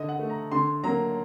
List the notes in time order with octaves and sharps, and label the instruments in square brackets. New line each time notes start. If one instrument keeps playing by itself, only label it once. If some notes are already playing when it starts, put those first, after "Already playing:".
Already playing: [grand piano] D3 D#5
F#5
A3
A#5
D3 C6
F#3 A#3 A#5